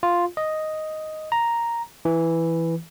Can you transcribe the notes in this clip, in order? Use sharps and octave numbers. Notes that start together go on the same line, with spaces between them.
F4
D#5
A#5
E3